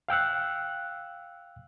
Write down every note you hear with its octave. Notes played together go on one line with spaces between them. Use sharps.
F5 G5 E6 F#6